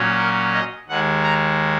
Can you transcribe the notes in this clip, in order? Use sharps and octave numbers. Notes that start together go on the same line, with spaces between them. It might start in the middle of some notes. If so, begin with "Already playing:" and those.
Already playing: A#2 F#3 C#4
A#4
D#5
D#2 D#3 G#3 F#5
A#5